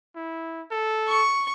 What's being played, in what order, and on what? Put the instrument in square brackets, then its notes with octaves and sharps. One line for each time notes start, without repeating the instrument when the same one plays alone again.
[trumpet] E4
A4
[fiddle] C#6